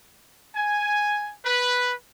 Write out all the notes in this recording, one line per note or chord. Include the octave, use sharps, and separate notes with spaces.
G#5
B4